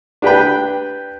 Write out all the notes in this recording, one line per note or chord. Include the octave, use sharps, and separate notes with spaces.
D4 G4 B4 G5